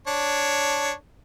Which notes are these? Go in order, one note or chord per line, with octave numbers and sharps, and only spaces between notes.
D4 C#5